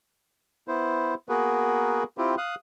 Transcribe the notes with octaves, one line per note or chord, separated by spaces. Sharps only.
B3 E4 C5
A#3 B3 F#4 G#4 A#4 B4
C4 E4 F4 G4
F5 D#6 F#6